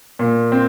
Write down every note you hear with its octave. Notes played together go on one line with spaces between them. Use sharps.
A#2
C4